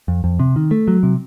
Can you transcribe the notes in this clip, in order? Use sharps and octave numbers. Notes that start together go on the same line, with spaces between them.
F2
F2
C3
D#3
A3
F#3
C3